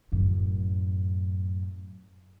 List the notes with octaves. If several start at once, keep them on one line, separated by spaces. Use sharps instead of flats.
F#2 A2